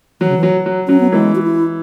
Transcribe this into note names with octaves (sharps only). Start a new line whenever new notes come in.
E3 F#3
C#3
E3
F#3
F#3
F#3 C#4
B3
E3 G#3
F#4
E4